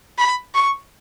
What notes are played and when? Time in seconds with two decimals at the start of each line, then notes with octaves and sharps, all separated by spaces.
0.18 B5
0.55 C#6